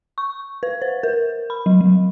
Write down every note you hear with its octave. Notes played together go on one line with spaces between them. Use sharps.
C#6
B4
C5
A#4
B5
F#3
F#3